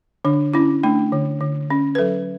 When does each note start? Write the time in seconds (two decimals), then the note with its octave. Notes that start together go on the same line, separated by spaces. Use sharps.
0.25 D3 D4
0.54 C#4 E4
0.83 A3 D4
1.12 D3
1.40 D3
1.70 C#4
1.95 B4
1.98 F#3 A4